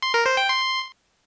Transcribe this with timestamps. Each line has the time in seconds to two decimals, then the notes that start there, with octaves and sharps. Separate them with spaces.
0.02 C6
0.14 A#4
0.26 C5
0.37 G5
0.49 C6